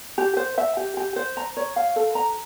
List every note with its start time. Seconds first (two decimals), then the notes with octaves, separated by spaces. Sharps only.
0.18 G4
0.37 C5
0.58 E5
0.77 G4
0.97 G4
1.16 C5
1.37 A#5
1.57 C#5
1.76 F5
1.96 A4
2.15 A#5